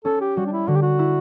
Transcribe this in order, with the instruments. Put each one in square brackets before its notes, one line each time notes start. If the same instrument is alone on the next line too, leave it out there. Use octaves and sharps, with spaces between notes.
[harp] C#4 [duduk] A4
[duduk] G4
[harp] G3 [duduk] F#4
[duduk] D4
E4
[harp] D3 [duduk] F#4
[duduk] G4
F#4
[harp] E4